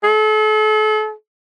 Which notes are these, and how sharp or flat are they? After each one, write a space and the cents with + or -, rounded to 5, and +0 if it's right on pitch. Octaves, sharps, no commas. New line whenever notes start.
A4 -40